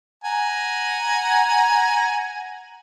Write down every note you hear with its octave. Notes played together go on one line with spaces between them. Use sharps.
F#5 G#5 A#5